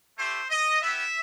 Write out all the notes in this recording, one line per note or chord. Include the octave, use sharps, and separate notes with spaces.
A3 E4 G4 C5
D#5
B3 E4 G4 E5